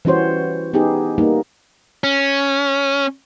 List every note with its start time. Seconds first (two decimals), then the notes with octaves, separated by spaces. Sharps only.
0.05 E3 G3 C#4 F#4 C5 C#5
0.73 B3 D#4 G4 G#4
1.18 G3 A#3 D#4
2.04 C#4